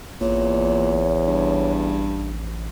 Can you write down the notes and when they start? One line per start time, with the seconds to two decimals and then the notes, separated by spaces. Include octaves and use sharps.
0.21 A1 E2 A#2 C#5
1.28 G2